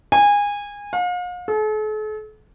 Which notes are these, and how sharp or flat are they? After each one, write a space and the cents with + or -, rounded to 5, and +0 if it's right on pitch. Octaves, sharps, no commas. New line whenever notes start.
G#5 -25
F5 +40
A4 -45